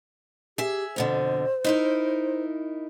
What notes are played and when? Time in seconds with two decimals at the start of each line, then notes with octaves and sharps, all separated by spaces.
0.58 G4 G#4 E5
0.96 F2 B2 D3 C5
1.64 D#4 E4 A#4